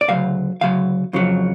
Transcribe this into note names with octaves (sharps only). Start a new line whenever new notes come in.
D5
D2 C#3 F#3 F5
D2 C#3 F#3 F5
F2 C#3 F#3